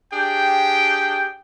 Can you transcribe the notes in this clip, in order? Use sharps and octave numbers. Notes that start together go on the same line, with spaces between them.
D4 G4 G#4 G5